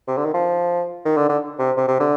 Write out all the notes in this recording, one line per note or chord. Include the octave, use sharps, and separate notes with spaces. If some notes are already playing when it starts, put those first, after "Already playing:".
C3
D3
D#3
F3
D#3
D3
D3
C3
C3
C3
D3